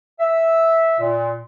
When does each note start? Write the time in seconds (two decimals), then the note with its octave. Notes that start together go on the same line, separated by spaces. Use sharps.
0.20 E5
0.99 A#2